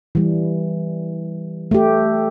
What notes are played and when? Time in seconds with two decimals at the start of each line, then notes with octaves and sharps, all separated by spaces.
0.15 E3 G3
1.71 A3 G4